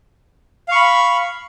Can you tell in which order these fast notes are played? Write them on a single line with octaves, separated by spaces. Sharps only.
F5 C#6 B5